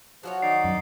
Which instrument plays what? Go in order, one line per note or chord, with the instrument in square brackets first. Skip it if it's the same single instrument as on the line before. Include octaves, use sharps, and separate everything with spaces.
[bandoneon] F3 [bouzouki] F#3 F#4 C#5
[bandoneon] D#3 D#4 D5 [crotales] C7
[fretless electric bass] F#2